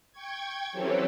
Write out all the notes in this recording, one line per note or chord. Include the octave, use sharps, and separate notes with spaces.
G5 C#6 G#6
E3 F#3 C4 C#4 G4 A4